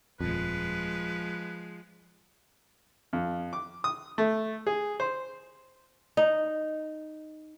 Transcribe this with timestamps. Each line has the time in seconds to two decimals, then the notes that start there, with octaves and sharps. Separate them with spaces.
0.21 D#1 F2 F3 G#3 B4
3.13 F2
3.53 D6
3.84 D#6
4.18 A3
4.67 G#4
5.00 C5
6.17 D#4